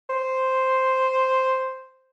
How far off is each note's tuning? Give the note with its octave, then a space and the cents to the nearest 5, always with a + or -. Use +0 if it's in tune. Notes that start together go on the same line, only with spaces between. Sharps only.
C5 +0